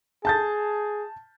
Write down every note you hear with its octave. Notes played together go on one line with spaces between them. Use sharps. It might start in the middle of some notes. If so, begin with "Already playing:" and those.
G#4 A5 G6 A6